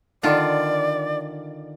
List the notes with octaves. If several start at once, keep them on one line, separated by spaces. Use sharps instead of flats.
D3 D#3 F4 D5